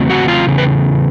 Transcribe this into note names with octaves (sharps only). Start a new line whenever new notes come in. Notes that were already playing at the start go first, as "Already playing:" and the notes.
Already playing: E2 C#3 F#3 A3 C4
F#4 F#5
F4 F5
E2 C#3
B4